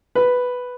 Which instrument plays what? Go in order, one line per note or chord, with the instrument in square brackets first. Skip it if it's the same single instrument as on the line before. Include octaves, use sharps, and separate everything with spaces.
[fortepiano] B4